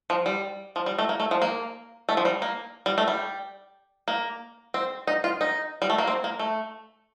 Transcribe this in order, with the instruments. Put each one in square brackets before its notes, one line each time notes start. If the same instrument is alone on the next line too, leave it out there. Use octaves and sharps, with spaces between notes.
[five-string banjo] F3
G3
F3
G3
A3
A#3
A3
F3
A#3
A3
F3
G3
A#3
G3
A3
G3
A#3
C4
D#4
F4
D#4
G3
A3
A#3
C4
A#3
A3